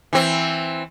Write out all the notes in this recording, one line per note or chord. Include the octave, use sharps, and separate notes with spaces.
E3 C4